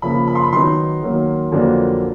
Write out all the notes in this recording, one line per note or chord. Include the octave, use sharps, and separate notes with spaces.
C#3 F3 A#3 B5
B5
C6
B5
D#3 F#3 B3 D#4 C6
D#3 F#3 A#3
F2 D3 F#3 A#3 D4